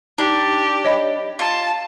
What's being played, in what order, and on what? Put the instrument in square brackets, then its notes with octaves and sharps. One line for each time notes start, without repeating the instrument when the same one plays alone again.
[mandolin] D4 [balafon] D#4 [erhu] G4
[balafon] C#5 D#5 B5
[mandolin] F4 [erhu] A5